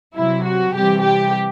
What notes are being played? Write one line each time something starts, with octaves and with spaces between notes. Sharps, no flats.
C3 F#3 E4
F#4
C3 E3 G3 G4
G4